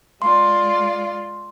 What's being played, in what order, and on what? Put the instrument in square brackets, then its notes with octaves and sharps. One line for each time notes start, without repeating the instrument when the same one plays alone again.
[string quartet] G#3 F4 D5 [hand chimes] C6